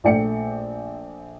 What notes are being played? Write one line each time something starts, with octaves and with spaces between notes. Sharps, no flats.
A#1 A3 D5 G5 C#7